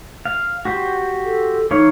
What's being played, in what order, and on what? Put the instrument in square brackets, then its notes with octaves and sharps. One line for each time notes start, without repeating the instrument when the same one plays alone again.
[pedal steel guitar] F5
F#4 G4 C5
[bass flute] A4
[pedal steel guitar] E3 C#5 F5 [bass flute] D#4